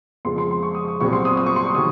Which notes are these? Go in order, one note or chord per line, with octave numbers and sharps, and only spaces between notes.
F2 C#3 F3 G#3 C4 C6
C6
C6
C#6
D#6
C#6
C2 A#2 F#3 C4 C#6
C6
D#6
D#6
C#6
C6
C#6
D#3 F#3 D#6